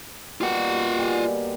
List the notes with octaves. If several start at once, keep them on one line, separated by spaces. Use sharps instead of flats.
B2 G3 A#3 F4 F#5
D3 G3 G#5